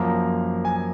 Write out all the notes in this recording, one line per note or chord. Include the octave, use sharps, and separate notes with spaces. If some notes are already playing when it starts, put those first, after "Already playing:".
Already playing: F#2 F3 A#3 A#5
G#5